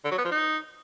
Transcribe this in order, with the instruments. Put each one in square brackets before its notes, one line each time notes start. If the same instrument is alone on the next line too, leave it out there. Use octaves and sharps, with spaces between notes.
[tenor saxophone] D3
F#3
B3
F3
D#4